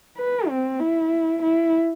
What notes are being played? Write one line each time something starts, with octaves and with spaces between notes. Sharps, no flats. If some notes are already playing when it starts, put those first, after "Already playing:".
B4
C4
E4
E4